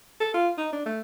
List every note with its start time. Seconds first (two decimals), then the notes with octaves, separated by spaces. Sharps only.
0.20 A4
0.34 F4
0.58 D#4
0.73 D4
0.86 A3